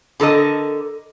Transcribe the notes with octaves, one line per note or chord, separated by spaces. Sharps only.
D3 A4 A#4 D#5